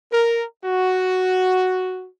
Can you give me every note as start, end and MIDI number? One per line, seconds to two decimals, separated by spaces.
0.12 0.45 70
0.65 2.06 66